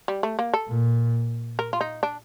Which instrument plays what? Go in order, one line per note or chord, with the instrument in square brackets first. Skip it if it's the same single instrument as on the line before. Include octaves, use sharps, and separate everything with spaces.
[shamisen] G3
A3
A#3
A4
[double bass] A#2
[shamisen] A#4
F4
D#4
D4